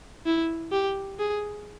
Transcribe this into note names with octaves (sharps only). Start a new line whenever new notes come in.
E4
G4
G#4